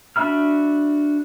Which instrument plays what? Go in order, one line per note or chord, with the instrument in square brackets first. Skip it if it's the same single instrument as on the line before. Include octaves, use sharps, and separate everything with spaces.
[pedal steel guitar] D4 F#4 E5 B5 F6